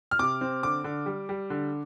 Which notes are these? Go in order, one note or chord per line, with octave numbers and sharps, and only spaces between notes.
F6
C3 D6
C4
D3 D6
D3
G3
G3
D3